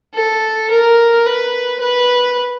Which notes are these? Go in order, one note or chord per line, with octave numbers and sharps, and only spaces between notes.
A4
A#4
B4
B4